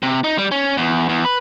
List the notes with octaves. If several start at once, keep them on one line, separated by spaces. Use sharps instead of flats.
C3
D#4
G3
C#4
E2
E2
B4